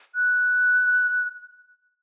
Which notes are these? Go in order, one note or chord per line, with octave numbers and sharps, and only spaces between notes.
F#6